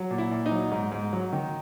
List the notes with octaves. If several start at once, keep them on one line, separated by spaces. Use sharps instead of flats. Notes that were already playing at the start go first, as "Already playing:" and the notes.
Already playing: F#3
A#2
E4
A#2
D#4
F#3
G#2
G#2
F#3
D#3